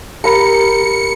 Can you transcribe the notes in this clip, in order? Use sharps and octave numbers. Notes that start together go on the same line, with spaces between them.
G4 A#4 B5 C#7